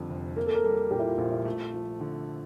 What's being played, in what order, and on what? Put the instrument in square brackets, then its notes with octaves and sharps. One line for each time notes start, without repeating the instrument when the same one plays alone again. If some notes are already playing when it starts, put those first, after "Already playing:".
Already playing: [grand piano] F2 D3 G3
F1
[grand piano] A#3 [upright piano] A#4
[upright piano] A4
A#4
[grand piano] G3 [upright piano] A4
[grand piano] A#2 [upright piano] G4
[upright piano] E4
F4
[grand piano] A#1 [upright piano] F4
[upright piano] E4
[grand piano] A3 [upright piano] F4
[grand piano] F3
D3